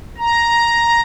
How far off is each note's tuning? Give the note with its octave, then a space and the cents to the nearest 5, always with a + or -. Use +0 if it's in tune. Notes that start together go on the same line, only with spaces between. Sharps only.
A#5 +5